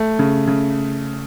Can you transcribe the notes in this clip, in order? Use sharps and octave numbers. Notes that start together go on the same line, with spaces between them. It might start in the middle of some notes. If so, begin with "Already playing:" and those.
Already playing: A3
C#3
C#3